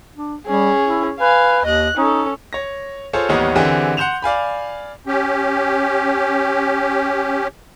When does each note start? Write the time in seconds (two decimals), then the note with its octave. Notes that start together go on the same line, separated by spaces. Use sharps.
0.16 D4
0.47 G3 C#4 G#4
0.84 E4
1.20 B4 F5 G#5
1.65 D#2 D#5 F#6
1.97 C#4 D#4 A4
2.53 C#5 A#6
3.13 F4 G#4 A4 C5 C#5
3.29 A1 D#2 G3 B3 C#5 D#5
3.55 D3 E3 C4 G4 G#4
3.97 F#5 C6 G6 E7 F7
4.22 D5 F5 G#5 B5
5.07 C#4 G4